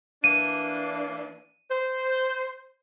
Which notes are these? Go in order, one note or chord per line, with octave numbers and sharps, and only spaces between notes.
E3 A#3 D4 D#7
C5